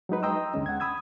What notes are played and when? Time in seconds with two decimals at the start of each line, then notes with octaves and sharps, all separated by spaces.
0.09 F#3 G#3 D#4 B4
0.23 D#5 G5 A#5 C6 D#6 E6
0.54 D#2 D3 G#3 C#4
0.66 F#5 G#6
0.80 B5 D#6 E6 G#6